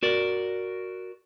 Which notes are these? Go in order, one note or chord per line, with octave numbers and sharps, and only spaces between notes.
F#4 A#4 D5